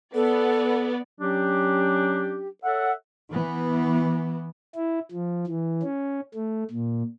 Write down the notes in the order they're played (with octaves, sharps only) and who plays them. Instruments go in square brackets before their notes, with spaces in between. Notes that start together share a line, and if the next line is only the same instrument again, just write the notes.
[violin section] B3 D5 [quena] A4
[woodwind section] F#3 C#4 D4 G4
A4 C#5 E5 F#5
[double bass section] E3 B3
[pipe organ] E4
F3
E3
C#4
A3
A#2